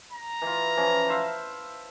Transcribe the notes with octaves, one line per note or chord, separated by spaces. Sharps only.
A#5
E3 F4
E3 F3 C#4
C5 E5 F5